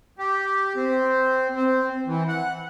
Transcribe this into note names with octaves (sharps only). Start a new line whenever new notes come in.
G4
C4
C4
E3
F#5